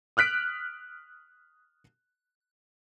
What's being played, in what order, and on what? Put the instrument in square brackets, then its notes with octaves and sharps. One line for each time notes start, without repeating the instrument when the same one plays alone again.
[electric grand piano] D#6 F6 F#6 B6 D7